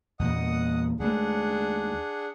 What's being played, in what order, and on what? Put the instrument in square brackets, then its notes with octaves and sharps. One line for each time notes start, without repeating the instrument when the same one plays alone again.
[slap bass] E2 A#2 A#3 [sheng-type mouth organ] D#5 F#5 D#6
[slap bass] D#2 G#3 A3 [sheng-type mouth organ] D4 G#4 F#5